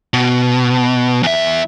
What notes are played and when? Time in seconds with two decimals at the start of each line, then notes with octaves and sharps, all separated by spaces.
0.14 B2
1.23 E2 E5